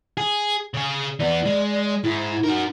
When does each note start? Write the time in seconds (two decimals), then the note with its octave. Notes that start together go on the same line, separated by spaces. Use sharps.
0.17 G#4
0.74 C#3 G#4
1.20 E3 B3 D5
1.45 G#3
2.04 G#2 E4
2.43 D#4 F#4 A#4